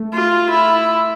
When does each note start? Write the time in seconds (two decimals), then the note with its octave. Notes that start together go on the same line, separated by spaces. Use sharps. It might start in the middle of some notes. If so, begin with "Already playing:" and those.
Already playing: A3
0.13 F4
0.51 E4